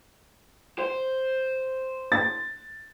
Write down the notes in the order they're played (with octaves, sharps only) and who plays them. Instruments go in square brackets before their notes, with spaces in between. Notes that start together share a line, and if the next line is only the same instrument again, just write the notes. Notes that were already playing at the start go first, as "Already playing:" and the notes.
[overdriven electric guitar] C5
[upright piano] A6